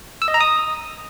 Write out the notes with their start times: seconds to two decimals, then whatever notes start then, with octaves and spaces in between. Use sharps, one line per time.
0.22 E6
0.28 D#5
0.34 A#5
0.41 D#6